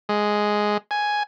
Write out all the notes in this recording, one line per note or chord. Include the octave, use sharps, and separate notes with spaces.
G#3
G#5